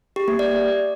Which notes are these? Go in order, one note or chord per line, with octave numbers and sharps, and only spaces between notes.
G4
A#3
D5